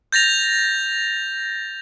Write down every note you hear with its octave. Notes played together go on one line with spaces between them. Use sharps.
G6 A6 A#6 F7